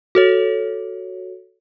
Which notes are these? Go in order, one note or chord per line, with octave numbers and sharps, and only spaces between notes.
F#4 A4 C#5